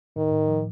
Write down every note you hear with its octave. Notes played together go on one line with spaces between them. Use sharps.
A2 D#3
A2
F3